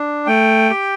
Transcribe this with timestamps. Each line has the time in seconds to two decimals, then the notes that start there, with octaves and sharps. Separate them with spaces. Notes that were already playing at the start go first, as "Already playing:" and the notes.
Already playing: D4
0.27 A3 G5
0.70 G4